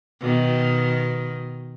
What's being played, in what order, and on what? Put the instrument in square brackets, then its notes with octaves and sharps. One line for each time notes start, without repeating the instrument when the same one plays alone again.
[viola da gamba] B2 D#3